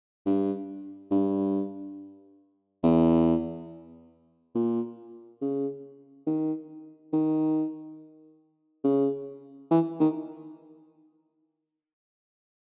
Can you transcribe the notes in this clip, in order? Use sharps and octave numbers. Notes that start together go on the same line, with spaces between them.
G2
G2
E2
A#2
C#3
D#3
D#3
C#3
E3
D#3